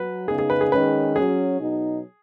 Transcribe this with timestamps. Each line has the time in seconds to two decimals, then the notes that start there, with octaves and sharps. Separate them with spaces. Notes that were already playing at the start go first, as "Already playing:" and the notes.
Already playing: F#3 B4
0.28 C#3 B3 D#4 G#4
0.39 G#4
0.50 B4
0.61 G#4
0.72 D#3 G#3 C#4 B4
1.16 F#3 C#4 G#4
1.60 B2 F#3 D#4